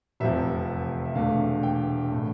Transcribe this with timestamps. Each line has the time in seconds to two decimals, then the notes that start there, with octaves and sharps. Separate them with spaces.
0.20 F1 E2 C3 F3 E5
1.05 E5
1.15 E1 E2 D3 A3 D4 F5
1.63 G5
2.12 A2 E3 A3